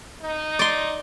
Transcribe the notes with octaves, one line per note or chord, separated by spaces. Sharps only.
D#4
D5 C6